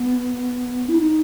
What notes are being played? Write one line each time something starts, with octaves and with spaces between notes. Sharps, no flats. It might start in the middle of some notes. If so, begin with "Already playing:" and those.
Already playing: B3
E4
D#4